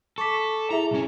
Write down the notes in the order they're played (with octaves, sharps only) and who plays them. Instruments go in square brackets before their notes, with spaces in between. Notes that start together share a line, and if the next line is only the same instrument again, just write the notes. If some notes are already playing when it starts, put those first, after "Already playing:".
[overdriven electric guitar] A4 [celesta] C#6 D6 B6
[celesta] E4 G#4 E5 [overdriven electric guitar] A#5
[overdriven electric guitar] B1 C#4